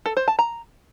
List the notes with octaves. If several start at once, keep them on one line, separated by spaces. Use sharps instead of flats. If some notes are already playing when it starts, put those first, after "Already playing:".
A4
C5
A5
A#5